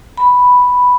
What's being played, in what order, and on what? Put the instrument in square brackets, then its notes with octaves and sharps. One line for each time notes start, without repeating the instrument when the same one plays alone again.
[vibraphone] B5